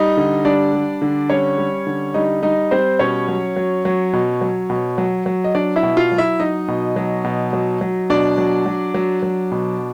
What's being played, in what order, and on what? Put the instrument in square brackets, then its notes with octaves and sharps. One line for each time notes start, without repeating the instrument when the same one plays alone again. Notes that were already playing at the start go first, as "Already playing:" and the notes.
Already playing: [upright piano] G3 D#4 D#5
D3
G3 D4 D5
G3
D3
G3 C#4 C#5
G3
D3
G3 D#4 D#5
G3 D#4 D#5
G3 C4 C5
B2 C#4 C#5
F#3
F#3
F#3
B2
F#3
B2
F#3
F#3
D#5
F#3 D4 D5
E4 E5
B2
F4 F5
F#3
E4 E5
F#3 D#4 D#5
B2
F#3
B2
F#3
F#3
B2 D4 D5
F#3
F#3
F#3
F#3
B2